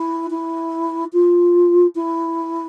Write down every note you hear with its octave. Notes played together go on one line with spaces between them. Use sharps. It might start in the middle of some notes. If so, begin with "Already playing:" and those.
Already playing: E4
E4
F4
E4